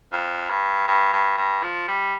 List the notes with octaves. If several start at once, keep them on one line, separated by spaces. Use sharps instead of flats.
F2
G2
G2
G2
G2
F3
G3